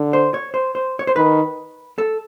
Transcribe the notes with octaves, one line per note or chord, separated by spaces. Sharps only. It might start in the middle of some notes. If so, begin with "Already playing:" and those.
Already playing: D3
C5
C#5
C5
C5
C#5
C5
D#3 B4
A4